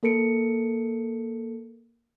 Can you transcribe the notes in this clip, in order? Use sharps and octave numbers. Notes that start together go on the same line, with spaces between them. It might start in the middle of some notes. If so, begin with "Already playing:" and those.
A#3 A4 A#4 C#7 D7